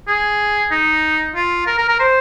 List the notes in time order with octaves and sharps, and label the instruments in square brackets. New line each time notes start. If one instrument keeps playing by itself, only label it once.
[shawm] G#4
D#4
F4
A#4
A#4
A#4
C5